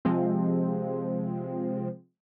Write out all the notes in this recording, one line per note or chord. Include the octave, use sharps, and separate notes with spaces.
C3 F3 G#3 C4